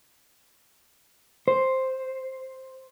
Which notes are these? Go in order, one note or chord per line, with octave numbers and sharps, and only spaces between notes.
C5